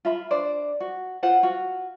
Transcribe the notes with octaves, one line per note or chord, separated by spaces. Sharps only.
F4 E5 B5
D4 C5 D5
F#4
F4 C5 F#5
F4 F#4